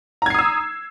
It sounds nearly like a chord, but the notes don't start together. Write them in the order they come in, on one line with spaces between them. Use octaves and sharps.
A#5 G#6 C7 D#6 E6